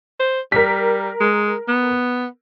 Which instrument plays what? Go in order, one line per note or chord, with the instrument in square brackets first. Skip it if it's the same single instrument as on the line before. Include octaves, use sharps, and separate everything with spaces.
[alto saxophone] C5
[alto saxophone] G3 [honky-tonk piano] A#4 B6
[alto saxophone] G#3
B3